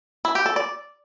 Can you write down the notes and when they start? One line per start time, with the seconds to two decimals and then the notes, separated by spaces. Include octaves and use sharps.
0.25 E4
0.35 G4
0.46 A4
0.56 D5